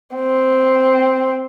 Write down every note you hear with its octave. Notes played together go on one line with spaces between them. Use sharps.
C4